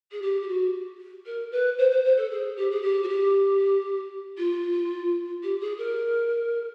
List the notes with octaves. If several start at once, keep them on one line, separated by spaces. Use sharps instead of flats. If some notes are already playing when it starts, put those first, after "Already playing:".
G#4
G4
G4
F#4
A#4
B4
C5
C5
C5
A4
G#4
G4
G#4
G4
F#4
G4
F4
G4
G#4
A#4